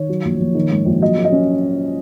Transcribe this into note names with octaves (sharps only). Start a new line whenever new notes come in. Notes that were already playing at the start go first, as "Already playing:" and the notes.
Already playing: D#3 C#5
F#3
A#1
A#1
D#3
G#2
A#1
F#3 D#5
A#3
D#5
C#4